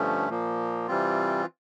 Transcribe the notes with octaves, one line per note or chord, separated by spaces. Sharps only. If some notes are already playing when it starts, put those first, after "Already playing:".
Already playing: G2 D3 F3 A3 C#4
A#2 F3 A#3
C3 E3 G3 C4 F4